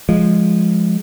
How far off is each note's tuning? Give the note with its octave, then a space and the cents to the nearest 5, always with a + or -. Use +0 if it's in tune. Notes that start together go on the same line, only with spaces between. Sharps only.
F3 +0 G#3 +0